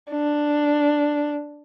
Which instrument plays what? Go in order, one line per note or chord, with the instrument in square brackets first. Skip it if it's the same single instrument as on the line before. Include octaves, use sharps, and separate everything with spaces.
[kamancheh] D4